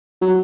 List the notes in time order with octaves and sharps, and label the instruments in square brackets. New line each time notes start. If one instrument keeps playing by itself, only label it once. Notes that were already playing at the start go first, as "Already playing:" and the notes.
[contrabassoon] F#3